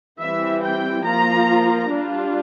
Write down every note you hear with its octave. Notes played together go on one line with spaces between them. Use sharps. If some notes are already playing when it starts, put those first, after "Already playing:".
E3 G3 C4 E5
G5
F3 A#3 F4 A#5
G3 D4 F4